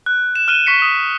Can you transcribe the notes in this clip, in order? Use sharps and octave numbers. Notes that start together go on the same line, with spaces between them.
F#6
E7
F6 F#6 D#7 E7 G7
C#6 B6 C#7
D#6